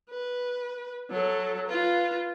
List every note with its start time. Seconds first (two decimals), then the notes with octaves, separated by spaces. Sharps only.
0.10 B4
1.10 F#3 A4
1.68 F4 B4